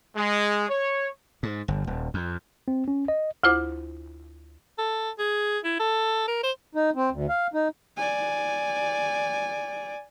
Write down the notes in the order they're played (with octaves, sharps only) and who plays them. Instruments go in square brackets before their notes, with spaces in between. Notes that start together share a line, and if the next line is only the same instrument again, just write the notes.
[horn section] G#3
C#5
[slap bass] G#2
G1
D#1
F2
[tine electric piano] C4
C#4
D#5
[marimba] D2 E4 F4 C5 D6
[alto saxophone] A4
G#4
E4
A4
A#4
C5
[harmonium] D#4
C4
D2
F5
D#4
[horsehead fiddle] D5 G#5